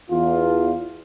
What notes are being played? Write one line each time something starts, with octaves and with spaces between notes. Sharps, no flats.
E2 F4